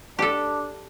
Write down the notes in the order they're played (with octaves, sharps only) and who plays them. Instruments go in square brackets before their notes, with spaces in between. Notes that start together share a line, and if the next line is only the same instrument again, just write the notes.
[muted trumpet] D4 [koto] G4 A4